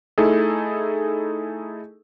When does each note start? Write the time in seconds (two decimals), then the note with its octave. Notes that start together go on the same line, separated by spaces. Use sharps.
0.18 A3 D#4 E4 G#4 A4